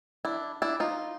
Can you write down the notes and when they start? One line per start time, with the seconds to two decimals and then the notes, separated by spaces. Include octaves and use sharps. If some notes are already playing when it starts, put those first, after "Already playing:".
0.25 D4 E4
0.62 D4 E4
0.80 D#4 F4